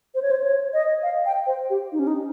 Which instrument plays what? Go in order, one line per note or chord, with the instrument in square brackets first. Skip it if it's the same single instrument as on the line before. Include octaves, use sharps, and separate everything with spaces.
[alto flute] C5
C#5
C5
C#5
D#5
F5
G5
C5
G4
D#4
C#4
D#4